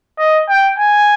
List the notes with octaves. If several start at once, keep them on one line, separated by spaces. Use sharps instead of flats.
D#5
G5
G#5